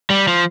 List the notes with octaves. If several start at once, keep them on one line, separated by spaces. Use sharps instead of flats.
G3
F3